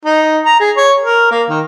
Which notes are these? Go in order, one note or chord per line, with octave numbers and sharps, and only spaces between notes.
D#4
A#5
G#4
C#5
A#4
A#3
D#3